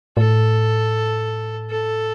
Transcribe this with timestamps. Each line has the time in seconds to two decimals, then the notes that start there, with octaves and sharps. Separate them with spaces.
0.17 A2 A4
1.70 A4